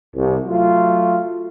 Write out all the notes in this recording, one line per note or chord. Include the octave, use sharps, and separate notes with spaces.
C2
F#3 A3 F4